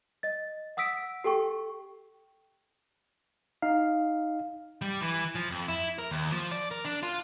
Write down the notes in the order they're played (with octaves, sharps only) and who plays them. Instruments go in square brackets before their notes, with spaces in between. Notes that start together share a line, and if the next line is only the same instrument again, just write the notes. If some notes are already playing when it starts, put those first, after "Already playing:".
[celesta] D#5 A6
F#5 D#6 E6 B6 D7
G4 A4 G5 C#6
[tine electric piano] D#4 F5
[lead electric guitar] G3
E3
F3
F2
E4
A#4
D#2
F3
D5
A#4
D4
F4